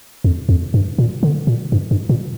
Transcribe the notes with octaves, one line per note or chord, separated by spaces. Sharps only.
F2
F2
G2
A#2
D3
A#2
G2
G2
A#2